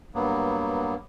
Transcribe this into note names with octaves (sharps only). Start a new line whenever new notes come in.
G2 F#3 A#3 B3